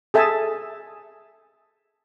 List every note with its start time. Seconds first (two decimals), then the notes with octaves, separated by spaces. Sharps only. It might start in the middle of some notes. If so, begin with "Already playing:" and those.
0.14 G#4 A4 E5 G#5 A5